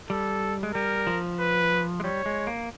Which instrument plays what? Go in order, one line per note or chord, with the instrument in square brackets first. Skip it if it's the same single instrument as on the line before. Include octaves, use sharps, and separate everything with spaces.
[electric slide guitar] G3 [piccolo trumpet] A4
[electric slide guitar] G#3
[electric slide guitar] G3 [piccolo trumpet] A#4
[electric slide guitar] F3
[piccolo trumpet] B4
[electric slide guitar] G#3
[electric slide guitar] G3 [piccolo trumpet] C#5
[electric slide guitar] G#3
A#3